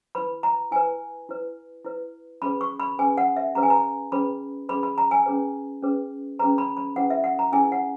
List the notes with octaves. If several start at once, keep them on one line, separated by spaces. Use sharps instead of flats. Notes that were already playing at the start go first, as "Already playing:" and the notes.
E4 B4 B5
A#5
E4 B4 G#5
E4 B4
E4 B4
C#4 G#4 B4 B5
C#6
B5
C#4 G#4 B4 G#5
F#5
E5
C#4 G#4 B4 A#5
G#5
A#5
C#4 G#4 B4 B5
C#4 G#4 B4 B5
B5
A#5
G#5
C#4 G#4 B4
C#4 G#4 B4
C#4 G#4 B4 A#5
B5
B5
C#4 E4 G#4 B4 F#5
E5
F#5
A#5
C#4 E4 G#4 B4 G#5
F#5